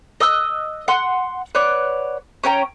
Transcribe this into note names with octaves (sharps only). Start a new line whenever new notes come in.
D#5 D#6 E6 F#6
F#5 C6
B4 C#5 D5 F#5
C#4 C#5 G5 A#5